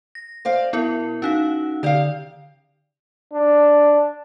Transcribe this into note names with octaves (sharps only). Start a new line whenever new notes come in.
A#6
C5 D5 F5
B2 B3 E4 A#4
C#4 D#4 F#4 F5
D3 G4 D5 F5
D4